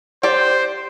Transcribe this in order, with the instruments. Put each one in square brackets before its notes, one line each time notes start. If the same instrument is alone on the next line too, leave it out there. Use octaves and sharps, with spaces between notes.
[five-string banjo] G4 D5 [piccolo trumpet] C5